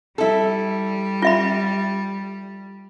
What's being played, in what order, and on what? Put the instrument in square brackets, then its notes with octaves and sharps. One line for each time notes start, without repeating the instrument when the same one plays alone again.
[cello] G3 [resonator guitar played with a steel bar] E4 A4
[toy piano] F4 E5 B5